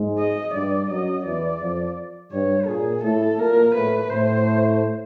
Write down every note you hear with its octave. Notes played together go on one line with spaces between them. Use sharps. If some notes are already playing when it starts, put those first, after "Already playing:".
Already playing: G#2 G#3
D#5
G2 G3 D5
F#2 F#3 D#5
E2 E3 D5
F2 F3
G2 G3 C#5
A#2 A#3 G#4
A2 A3 A4
A#2 A#3 A#4
A2 A3 B4
A2 A3 C5